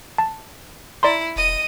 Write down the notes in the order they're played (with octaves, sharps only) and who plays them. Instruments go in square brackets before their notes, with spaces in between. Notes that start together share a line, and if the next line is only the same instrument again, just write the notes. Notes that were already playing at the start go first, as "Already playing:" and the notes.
[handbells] A5
[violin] E4 [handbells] D5 A#5 C6
[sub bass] E1 [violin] D#5 D#7